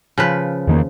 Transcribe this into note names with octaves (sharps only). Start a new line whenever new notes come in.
C#3 F3 B4
E2 D#3 A#3